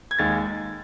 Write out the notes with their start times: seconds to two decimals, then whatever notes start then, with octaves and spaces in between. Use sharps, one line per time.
0.11 G#6
0.19 D#2 D#3 G#3 A6